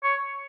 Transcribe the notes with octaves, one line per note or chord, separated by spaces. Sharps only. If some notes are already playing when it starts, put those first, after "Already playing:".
C#5